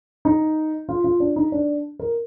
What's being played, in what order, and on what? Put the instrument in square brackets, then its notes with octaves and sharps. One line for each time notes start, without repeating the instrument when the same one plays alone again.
[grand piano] D#4
F4
F4
D4
D#4
D4
A#4